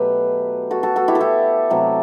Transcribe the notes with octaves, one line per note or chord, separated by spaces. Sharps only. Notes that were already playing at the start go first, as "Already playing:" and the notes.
Already playing: B2 F#3 A3 G4 B4
F#4 A4
F#4 A4
F#4 A4
E4 G4
A4
E4 G4
C3 F#3 A3